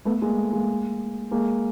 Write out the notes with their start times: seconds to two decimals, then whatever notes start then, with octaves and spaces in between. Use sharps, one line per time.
0.05 A3 B3
0.22 G#3 A#3
0.38 A3
0.53 G#3 A#3
1.31 G#3 A#3